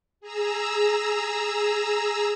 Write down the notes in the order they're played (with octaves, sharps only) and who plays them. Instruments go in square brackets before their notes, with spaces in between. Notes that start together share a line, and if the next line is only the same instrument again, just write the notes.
[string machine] G#4 A#5 E6